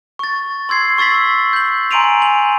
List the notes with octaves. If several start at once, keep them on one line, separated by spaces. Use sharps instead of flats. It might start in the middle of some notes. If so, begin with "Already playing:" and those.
C#6 A6
C6 E6 G#6 C7
C#6 E6 A6 B6 F#7
G6 F#7
G#5 A#5 C6 D7 D#7 F7
F#7